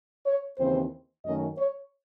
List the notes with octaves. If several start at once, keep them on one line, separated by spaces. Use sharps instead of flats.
C#5
D#2 C#3 E3 C4 C5
F#2 D#3 A3 C#4 D#5
C#5